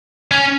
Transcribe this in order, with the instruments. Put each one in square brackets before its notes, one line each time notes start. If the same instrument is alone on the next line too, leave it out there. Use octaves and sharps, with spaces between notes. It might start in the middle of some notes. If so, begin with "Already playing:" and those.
[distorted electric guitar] C#4